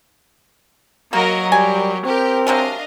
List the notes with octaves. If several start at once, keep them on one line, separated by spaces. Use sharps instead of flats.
F#3 A#3 F#4 A#4 D#5
G3 G4 A#4 G#5
C4 G4 A#4
C3 F#3 G#3 D4 D#5 F5